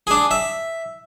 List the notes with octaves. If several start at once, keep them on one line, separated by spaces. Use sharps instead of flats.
D4 G#4
E5